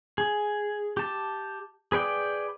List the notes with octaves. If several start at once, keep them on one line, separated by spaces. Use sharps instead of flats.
G#4
G4 A5
G#4 B4 D5 G5